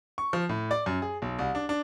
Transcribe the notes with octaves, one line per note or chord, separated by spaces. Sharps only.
C#6
F3
A2
D5
F#2
G#4
B1
C2
D4
D4